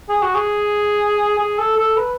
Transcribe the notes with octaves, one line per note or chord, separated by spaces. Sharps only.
G#4
F#4
G#4
G#4
A4
A4
B4